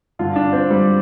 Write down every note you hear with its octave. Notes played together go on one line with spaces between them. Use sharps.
G2 D3 F4
D4
C4
G3